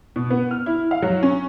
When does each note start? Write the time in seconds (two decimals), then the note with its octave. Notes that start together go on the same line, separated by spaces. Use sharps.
0.16 B2
0.30 B3
0.51 F6
0.66 E4
0.91 F5
1.02 F#3
1.23 C#4